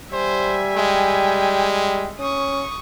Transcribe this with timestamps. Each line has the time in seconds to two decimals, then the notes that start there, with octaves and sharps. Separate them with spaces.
0.13 G3 C5 E5 G#5
0.76 G#3 G5
2.19 C#4 C#6 D#6